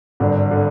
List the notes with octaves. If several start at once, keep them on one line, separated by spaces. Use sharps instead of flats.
G#1 G2 D3
D3